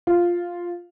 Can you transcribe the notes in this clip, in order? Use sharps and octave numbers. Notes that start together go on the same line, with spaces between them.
F4